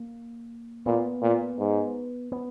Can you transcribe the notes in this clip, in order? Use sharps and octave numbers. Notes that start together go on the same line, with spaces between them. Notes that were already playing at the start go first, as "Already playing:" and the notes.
Already playing: A#3
A#2 B3
A#2
G#2
B3